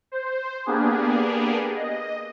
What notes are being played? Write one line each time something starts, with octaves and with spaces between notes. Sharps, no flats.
C5
A#3 B3 D4 G4 G#4
D#5